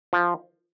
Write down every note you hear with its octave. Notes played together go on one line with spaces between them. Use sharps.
F3